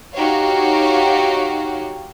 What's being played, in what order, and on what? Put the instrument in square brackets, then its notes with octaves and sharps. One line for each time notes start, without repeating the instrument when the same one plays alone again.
[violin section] D#4 F#4 G4 C#5 F5